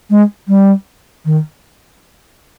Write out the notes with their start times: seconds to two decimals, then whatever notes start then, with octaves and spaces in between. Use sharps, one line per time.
0.10 G#3
0.48 G3
1.25 D#3